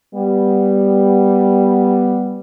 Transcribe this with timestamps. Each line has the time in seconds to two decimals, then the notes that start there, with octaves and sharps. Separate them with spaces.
0.14 G3 B3